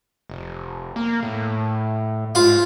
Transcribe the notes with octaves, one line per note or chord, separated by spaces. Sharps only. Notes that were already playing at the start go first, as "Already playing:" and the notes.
F1
A#3
A2
G#2 F4